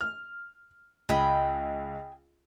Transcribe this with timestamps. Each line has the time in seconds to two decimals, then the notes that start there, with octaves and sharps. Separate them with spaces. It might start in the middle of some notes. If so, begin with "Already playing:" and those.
0.01 F6
1.09 C#2 G#4 G5 B5